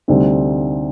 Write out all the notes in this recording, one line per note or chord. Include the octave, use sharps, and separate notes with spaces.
D2 C3 G3 C4 D#4